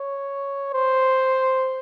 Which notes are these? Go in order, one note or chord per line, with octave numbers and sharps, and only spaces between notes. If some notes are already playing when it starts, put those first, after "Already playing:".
Already playing: C#5
C5